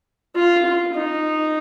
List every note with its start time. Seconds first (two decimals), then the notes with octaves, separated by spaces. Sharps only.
0.36 F4
0.65 F4
0.95 D#4